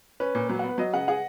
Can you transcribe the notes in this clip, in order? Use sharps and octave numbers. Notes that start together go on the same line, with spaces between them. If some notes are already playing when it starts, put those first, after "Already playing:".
C#4 B4
A#2
F#3 B4
F#5
B3 B4
F#3 D#5
C#3 F#5
G#4 F#5